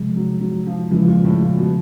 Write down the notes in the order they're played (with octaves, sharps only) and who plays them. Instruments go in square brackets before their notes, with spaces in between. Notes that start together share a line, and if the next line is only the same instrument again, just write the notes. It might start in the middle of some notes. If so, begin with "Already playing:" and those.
Already playing: [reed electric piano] C3 F3 G#3
[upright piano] F#3
F#3
F3
[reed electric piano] E2 C#3 F3 G#3 [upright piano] E3
[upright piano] A#2
A2
A#2
B2